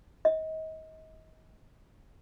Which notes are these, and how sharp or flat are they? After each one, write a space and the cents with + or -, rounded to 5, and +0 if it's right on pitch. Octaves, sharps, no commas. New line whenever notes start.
D#5 +30